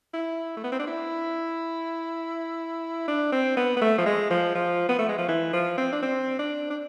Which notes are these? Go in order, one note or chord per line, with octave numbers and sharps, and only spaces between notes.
E4
A3
B3
C4
D4
E4
D4
C4
B3
B3
A3
F3
G#3
F3
F3
B3
A3
G#3
F3
E3
F3
C4
D4
C4
D4
D4